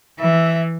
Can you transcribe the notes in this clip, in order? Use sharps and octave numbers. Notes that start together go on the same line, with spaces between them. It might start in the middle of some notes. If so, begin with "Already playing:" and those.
E3 E5